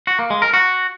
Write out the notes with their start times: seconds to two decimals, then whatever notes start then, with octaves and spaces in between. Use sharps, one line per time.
0.07 F#4
0.19 A#3
0.30 G#3
0.42 A#4
0.53 F#4